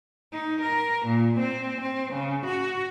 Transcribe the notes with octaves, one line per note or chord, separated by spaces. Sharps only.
D#4
A#4
A#2
C4
C4
C#3
F#4